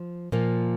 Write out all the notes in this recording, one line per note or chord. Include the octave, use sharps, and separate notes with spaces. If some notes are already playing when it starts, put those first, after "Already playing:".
Already playing: F3
A#2 F3 A#3